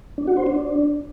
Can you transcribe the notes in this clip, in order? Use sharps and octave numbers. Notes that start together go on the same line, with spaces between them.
D4
F#4
C5
D4